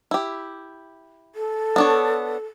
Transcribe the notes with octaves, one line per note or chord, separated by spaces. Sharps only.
E4 G4
A4
B3 D4 C#5